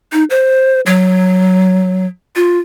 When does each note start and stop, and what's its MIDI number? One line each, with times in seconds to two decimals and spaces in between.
0.12 0.24 63
0.30 0.80 72
0.86 2.06 54
2.36 2.59 65